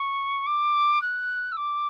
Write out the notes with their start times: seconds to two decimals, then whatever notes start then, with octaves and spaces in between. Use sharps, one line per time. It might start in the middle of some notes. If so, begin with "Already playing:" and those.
Already playing: C#6
0.46 D6
1.02 F#6
1.52 E6
1.57 D6